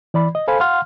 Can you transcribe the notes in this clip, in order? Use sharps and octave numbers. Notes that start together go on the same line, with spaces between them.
E3 D5 B5
D#5
A4 C5 F5 G#5 B5
F5 F#5 C6 F6